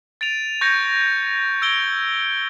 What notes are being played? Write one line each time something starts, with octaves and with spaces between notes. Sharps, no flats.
A6 D7 D#7 F7
C#6 G6 G#6 A#6 C#7
E6 G#6 D7 G7